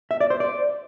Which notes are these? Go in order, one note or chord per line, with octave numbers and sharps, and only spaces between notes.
E5
D5
C5
D5